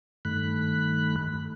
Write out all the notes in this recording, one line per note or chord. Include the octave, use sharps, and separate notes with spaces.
G2 D#3 A3 B5 F#6